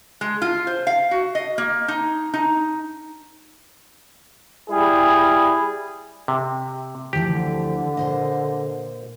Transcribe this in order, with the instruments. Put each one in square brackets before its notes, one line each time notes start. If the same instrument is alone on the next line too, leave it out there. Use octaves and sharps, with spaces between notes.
[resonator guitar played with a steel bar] G#3
F4
C5
F5
F#4
D#5
A#3
D#4
D#4
[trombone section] G3 E4 G#4
[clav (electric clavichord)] C3
[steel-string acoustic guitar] D2 E3 F3 [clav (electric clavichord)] G4
[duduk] D3
[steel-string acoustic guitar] A#2 C5 D#5